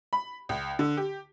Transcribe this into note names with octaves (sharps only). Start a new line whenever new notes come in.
B5
C#2
D3
G4